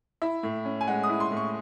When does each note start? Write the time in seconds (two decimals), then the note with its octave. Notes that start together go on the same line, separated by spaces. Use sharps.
0.22 E4 E5
0.43 A2
0.65 C#4
0.81 G#5
0.87 G#3 F#5
1.03 D#6
1.09 E4
1.20 C6
1.31 A2
1.37 C#6